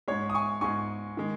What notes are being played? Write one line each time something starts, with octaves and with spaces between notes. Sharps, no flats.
G#2 G#3 C#5
D#6
G#5 C#6
G#2 G#3 G#5 C#6
D#3 G#3